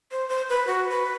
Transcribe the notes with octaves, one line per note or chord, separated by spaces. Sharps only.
C5
C5
B4
F#4
B4